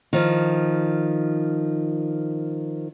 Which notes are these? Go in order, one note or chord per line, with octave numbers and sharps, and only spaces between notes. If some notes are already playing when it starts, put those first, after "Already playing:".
D#3 F3